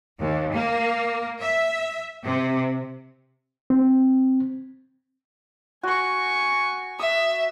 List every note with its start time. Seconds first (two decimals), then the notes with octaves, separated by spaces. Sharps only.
0.20 D#2
0.55 A#3
1.40 E5
2.25 C3
3.70 C4
5.83 F#4 G#5 C#6
6.99 E5 D#6